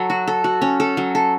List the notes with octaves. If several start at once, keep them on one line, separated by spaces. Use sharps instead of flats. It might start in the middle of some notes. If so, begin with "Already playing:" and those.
Already playing: F#3 A4
F#4
A4
F#4
C#4
A4
F#3
A4